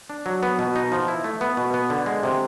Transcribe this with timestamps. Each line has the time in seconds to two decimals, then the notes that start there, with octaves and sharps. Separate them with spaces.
0.10 D4
0.26 F#3
0.43 B3
0.59 B2
0.76 D#4
0.92 F3
1.08 E4
1.24 A3
1.41 B3
1.57 B2
1.74 B3
1.90 D3
2.06 G#3
2.23 C3